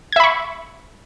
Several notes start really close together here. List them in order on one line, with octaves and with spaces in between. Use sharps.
G#6 E5 B5 C#6